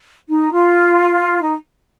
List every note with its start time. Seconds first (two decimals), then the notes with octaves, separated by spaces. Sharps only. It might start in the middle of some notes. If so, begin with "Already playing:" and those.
0.29 D#4
0.52 F4
1.42 D#4